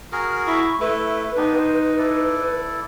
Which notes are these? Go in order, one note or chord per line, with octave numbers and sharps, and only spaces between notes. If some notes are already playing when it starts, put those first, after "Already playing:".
F#4 G#4 A#4 F6
E4 C#6
A3 E4 B4
B3 D4 D#4 G4
C5
E4 A4 D5